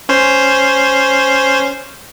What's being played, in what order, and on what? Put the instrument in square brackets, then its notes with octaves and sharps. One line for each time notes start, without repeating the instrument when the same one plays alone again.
[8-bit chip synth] C#4 C5